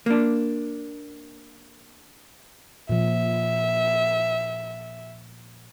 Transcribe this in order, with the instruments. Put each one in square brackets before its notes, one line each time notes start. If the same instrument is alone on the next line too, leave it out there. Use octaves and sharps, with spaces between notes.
[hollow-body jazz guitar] A#3 D4
[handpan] A#2 F3 [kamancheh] E5